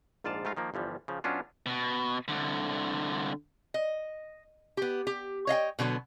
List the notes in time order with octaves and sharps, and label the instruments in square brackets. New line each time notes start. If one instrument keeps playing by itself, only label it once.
[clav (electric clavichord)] A#1 G#2 F4 D5 F5 A5
G#2 A3 F4 F5 A#5
D#3 F3 A#3
G1 E3 F3 G3
C#3 F3
B2 F#3 C#4 D4 F4
[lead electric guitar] B2
C2 D3
[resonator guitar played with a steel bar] D#5
B3 G4
G4
C#5 D#5 F5 G5
B2 D3 F#3 B3